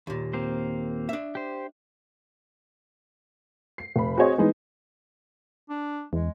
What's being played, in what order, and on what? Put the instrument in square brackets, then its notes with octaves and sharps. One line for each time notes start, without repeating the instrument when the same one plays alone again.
[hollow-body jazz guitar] D#2 A#2
[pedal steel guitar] A#3 C4 C5
[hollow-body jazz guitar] D4 E5
[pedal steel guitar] G4 C5
[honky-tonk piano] C7
F1 B5
C4 F#4 G#4 C5 C#5 D#5
E3 G#3 B3 D#4
[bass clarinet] D4
[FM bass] E2 [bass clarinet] G#3